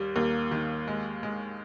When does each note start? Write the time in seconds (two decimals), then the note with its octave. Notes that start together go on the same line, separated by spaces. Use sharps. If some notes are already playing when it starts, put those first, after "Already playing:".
Already playing: D#2 G3
0.16 D#2 A#3
0.51 D#3
0.88 G#3
1.23 G#3